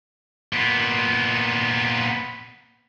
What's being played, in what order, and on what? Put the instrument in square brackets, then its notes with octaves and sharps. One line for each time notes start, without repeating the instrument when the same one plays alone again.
[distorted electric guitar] A#2 B3